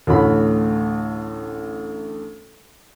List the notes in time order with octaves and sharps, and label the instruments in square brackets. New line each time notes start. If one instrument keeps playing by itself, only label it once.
[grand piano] A1 D2 B5